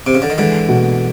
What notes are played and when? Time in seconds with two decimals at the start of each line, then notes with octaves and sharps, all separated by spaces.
0.07 C3
0.15 C#3
0.22 D3
0.30 D#3
0.38 D3 E3 G#3
0.69 B2